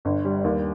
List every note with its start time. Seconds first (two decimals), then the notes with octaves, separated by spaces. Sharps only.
0.05 G1
0.25 G3
0.44 D#2